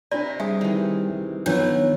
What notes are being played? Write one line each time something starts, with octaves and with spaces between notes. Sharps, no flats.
C3 D4 D5 A#5 B5
G3 G#4 E5
D#3 E3
D#3 F#3 B3 D4 F4 B4 C#5 E5